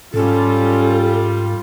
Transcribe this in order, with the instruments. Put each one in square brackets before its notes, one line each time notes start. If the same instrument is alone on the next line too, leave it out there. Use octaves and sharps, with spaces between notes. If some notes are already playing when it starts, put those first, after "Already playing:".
[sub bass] G#2 [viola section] G3 F4 [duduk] C#4 [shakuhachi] A4